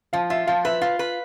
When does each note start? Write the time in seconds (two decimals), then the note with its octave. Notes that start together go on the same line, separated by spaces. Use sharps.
0.13 F3 F5
0.30 F4 E5
0.47 F3 F5
0.65 B4 E5
0.82 F4 F5
0.99 B4